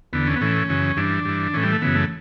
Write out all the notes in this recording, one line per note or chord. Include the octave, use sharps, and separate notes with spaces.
E2 D3 B3
C#4
B3
A2 E3 C#4
F#2 C#3 E3
G2 E3 D4
G2 E3
A2 E3 C#4
G3
A3
F#2 C#3 E3 B3
A3